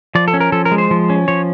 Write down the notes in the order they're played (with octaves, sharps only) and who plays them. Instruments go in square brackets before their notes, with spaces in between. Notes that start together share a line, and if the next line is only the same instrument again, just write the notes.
[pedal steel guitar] F3 D5
A4
C#4
A#4
F3 A4
A#4
G#3
C5
F3
C#4
F3 C#5